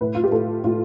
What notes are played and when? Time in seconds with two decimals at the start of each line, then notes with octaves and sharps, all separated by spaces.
0.01 A2 B4
0.15 F4
0.24 G4
0.32 A2 A4
0.64 A2 F4